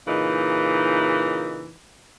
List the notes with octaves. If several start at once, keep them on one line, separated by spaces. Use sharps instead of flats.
A#2 C#3 E3 D#4